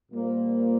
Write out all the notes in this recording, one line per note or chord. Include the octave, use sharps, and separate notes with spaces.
A#2 G3 A#3 F4 C5